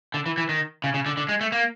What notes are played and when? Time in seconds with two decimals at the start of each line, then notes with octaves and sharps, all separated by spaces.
0.14 D3
0.26 E3
0.38 E3
0.49 D#3
0.84 C#3
0.94 C#3
1.06 D3
1.17 D3
1.29 G#3
1.41 A3
1.52 A#3